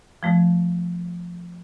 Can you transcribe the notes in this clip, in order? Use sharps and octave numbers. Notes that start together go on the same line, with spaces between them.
F3 A3